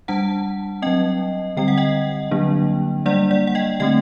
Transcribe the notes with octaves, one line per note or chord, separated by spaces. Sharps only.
G3 D4 F#5 A5
F#3 C4 D#5 G5
D3 G3 C4 G5
F#5
D#5 G5
D3 F#3 A#3 D4
G3 A#3 D4 D5 F#5
D5 F#5
F#5
D#5 G5
D3 A3 C4 D#5 G5